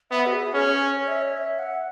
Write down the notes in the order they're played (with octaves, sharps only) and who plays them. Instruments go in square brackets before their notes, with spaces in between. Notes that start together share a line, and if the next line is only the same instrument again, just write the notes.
[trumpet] B3 [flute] E5
[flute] F#4
G#4
[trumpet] C#4 [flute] G#4
[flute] C#5
C#5
E5
C#5
E5
F#5